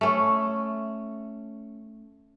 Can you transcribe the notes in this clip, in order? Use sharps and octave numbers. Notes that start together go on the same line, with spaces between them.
A3 C#4